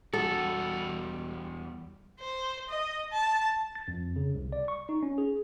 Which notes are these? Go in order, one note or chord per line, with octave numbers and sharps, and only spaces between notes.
E2 G3 F#4 A4
C5
D#5
A5
A6
F2
C#3
C2
D5
C#6
D#4
C#4
G#4